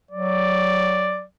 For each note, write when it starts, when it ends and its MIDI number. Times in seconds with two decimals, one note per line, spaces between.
0.12 1.27 54
0.12 1.24 74